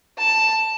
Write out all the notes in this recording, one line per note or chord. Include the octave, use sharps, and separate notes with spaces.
A5